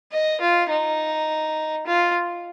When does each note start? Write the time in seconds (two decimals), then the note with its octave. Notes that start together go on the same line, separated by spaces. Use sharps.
0.12 D#5
0.41 F4
0.70 D#4
1.87 F4